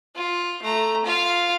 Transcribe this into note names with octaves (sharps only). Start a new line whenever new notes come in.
F4
A3 A#5
F4 F5